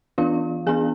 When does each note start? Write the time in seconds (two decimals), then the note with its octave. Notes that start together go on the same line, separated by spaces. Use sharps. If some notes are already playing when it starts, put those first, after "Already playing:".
0.18 E3 B3 D4 F4 F5
0.67 E3 B3 D4 G#4 G#5